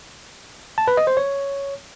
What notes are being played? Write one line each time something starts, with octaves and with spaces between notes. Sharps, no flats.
A5
B4
D#5
C5
C#5